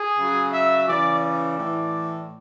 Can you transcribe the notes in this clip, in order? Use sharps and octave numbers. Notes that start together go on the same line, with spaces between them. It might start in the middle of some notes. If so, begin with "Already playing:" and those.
Already playing: G#4
C#3 F#3
E5
C#3 E3 D5
D5
A2 E3